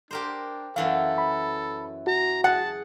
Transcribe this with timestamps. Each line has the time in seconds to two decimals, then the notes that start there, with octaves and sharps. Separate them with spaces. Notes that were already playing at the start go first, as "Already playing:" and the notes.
0.11 D4 G4 A#4 C5
0.76 F#2 E3 F#3 A4 F5
1.18 B5
2.07 F#4 A#5
2.44 G#4 F#5 A5